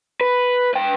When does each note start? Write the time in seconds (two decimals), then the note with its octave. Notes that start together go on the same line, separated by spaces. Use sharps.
0.21 B4
0.74 B4 G5